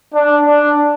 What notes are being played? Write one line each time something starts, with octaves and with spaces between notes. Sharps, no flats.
D4
D4